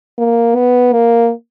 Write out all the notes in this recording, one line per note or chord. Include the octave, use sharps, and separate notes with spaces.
A#3
B3
A#3